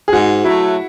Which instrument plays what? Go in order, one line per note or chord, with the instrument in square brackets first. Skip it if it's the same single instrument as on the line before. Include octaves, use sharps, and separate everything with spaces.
[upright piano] G#4
[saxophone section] G#2 [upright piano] F#4
[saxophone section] F#3 A3 [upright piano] E4